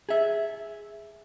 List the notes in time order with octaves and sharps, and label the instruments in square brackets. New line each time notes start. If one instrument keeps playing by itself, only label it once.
[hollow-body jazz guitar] G#4 E5